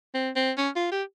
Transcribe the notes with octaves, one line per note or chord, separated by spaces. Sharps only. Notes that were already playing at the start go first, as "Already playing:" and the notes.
C4
C4
C#4
F4
G4